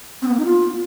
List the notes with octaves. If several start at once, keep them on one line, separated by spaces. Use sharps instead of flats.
C4
B3
A#3
D#4
F4